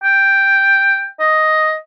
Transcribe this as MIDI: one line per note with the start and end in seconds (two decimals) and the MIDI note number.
0.04 1.07 79
1.20 1.76 75